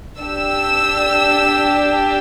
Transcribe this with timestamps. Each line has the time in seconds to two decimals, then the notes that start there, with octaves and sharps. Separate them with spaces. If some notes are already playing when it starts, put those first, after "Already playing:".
0.20 D4 G4 E6